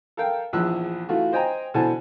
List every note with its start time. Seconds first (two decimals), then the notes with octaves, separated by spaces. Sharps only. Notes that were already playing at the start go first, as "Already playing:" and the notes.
0.17 A4 A#4 F5 G5
0.53 A#1 E2 F3 E6 F#6
1.09 E3 A3 F4 F#4
1.32 C5 D#5 G5 G#5 A#5
1.74 B2 D3 E3 C5 G#5 A5